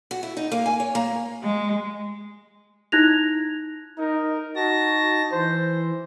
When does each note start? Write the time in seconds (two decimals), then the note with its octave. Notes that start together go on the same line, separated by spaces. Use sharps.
0.11 F#4
0.23 E4
0.37 D#4
0.52 A#3
0.66 G#5
0.80 C#5
0.95 A#3
1.43 G#3
2.92 D#4 E4 F#6 G#6 A#6 F7
3.98 D#4 A#4
4.56 D#4 F#4 A5 A#6
5.32 E3 C5